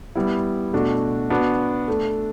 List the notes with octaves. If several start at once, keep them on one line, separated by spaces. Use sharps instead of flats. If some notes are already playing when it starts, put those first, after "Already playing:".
G3 B3 E4
B2 A3 D4 F#4
B3 D4 F#4
A3 D4 A4